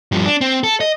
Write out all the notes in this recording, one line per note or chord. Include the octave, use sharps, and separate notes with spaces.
G2 F3
D4
C4
A4
D#5